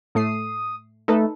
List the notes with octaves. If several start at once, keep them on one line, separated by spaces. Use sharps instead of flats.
A2 A3 D#6 C7
A3 D#4 A4 B4